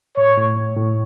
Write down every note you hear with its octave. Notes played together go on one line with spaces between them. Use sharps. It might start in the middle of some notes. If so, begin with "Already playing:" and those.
A2 C#5
A2
A3
A2